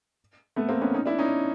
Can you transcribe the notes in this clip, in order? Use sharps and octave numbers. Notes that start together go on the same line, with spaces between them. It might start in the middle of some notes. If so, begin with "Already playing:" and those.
A3 B3
A#3 C4
B3 C#4
C#4 D#4
D4 E4
C#4 D#4